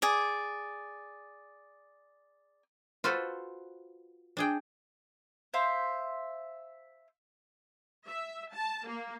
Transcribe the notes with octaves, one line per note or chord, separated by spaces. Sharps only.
G#4 D5
F4 F#4 A4 B4 C5
D4 G#4 G5
C5 E5 F5 C6
E5
A5
A#3